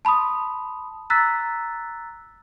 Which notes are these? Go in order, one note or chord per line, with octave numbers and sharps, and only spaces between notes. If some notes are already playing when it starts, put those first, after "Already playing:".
A5 B5 C6 D#6
A#5 E6 F#6 A6 B6